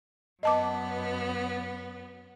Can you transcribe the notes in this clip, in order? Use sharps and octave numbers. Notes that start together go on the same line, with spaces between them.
F#2 B3 D#5 A5 D6